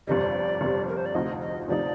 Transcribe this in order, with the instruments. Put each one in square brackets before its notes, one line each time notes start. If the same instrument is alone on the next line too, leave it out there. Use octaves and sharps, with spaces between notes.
[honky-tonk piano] G1 F2 C3 G3 [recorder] D5 D#5
[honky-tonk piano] G1 F2 C3 G3
[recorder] A#4
C5
D5
[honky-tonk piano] D2 C3 F3 C4 D#4 [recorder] D#5
[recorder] D#5
[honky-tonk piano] D2 C3 F3 C4 D#4 [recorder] D5